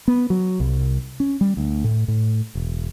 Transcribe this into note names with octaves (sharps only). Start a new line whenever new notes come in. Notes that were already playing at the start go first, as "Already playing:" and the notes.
B3
F#3
C2
C#4
G3
D2
A2
A2
E1